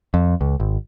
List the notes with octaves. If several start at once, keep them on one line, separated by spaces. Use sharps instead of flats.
F2
C#2
G#1